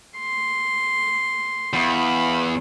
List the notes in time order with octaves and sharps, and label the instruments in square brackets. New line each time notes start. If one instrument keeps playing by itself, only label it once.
[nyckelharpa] C6
[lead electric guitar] E2 [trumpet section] F5 B5